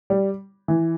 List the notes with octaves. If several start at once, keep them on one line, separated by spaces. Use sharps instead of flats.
G3
E3